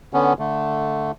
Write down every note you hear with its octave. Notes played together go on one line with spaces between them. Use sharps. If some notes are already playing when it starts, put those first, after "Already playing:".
D3 B3 C#4
D3 A3